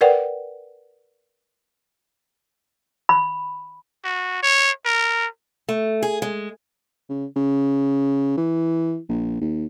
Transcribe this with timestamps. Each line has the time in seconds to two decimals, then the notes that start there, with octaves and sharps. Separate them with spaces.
0.01 A#4 B4 D5 F#5 G5
3.09 B5
4.04 F#4
4.43 C#5
4.85 A#4
5.69 A3
6.03 G#4
6.22 G#3
7.10 C#3
7.36 C#3
8.38 E3
9.09 A#1
9.41 D#2